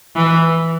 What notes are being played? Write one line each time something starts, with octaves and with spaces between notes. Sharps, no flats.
E3